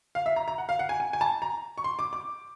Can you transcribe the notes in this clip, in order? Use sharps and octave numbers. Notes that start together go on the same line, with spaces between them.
F5
E5
A#5
A#5
F#5
F5
F#5
G#5
G#5
G#5
A5
A#5
C#6
C6
D6
D6